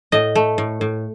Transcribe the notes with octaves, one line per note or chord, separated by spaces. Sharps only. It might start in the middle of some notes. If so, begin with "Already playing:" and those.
A2 D#5
A3
A2
A2